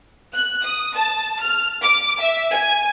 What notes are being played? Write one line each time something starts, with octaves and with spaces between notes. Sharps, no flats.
F#6
D#6
A5
F6
D6
E5
G#5